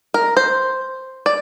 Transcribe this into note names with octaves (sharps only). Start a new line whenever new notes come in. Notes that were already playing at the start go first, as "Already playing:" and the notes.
A#4
C5
D5